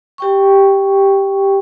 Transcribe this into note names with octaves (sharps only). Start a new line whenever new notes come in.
G4 G5 C#6